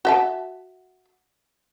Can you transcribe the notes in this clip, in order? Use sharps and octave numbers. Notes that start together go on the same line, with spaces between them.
F#4 E5 A5